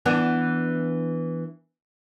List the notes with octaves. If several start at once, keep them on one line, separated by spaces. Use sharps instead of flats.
E3 B3 D4